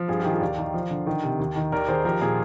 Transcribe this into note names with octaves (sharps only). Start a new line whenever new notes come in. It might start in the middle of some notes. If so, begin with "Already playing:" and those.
Already playing: F3
G2 F4 G#4
G4
D#3
F4 G#4
D#2 D5 F5
D#3
F3
D3
D#3
C3
D#2
D#3
D#2 A#4 D5
D#3 G#4 C5
F3 G4 A#4
A#2 F4 G#4